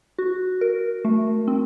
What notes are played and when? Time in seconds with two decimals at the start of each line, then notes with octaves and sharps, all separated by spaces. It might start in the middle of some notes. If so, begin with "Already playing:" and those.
0.19 F#4
0.61 A#4
1.05 A3
1.48 C4